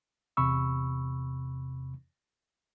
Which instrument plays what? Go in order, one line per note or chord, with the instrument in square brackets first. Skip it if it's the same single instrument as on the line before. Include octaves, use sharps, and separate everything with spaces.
[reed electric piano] E2 C3 B5 C#6 E6